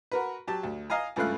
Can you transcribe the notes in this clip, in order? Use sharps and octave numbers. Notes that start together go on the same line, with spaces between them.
F#4 A#4 B4
F#3 G4 A5
D2
D#5 F5 G#5 A#5
C#2 G2 F3 A3 F5 F#6